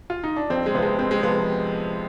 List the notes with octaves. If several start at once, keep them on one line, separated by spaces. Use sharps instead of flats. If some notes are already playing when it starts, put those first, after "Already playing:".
F4
D#4
D4
F2 C4
G#3
C3 F3 G#3 B3
F2 C4
G#3
C3 F3 B3